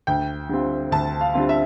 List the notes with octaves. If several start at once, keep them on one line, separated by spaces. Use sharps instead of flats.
D2 G5
D3 G3 C4 F4
D2 A5
F5
D3 G3 C4 F4
E5